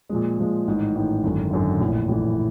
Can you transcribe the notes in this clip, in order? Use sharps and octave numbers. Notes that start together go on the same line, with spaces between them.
A#2 F3 G#3
A#2 F3 G#3
A1 G#2 D#3
A1 G#2 D#3
G#1 F#2 D3
G#1 F#2 D3
A#1 A2 E3
A#1 A2 E3